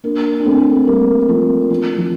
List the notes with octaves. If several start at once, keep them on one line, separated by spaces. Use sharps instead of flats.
A#3 D4
D4
A3 C4
G3 A#3
F3 A3
F3
F3